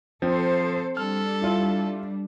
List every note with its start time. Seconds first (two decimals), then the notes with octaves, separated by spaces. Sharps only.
0.22 F3 C4 A4 C5
0.97 G3 D4 A4 F6
1.42 E4 F4